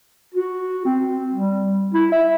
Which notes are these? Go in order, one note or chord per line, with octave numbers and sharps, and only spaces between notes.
F#4
C4
G3
E4
E5